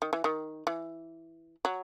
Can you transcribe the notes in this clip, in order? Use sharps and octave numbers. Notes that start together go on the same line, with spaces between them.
D#3
E3
D#3
E3
F#3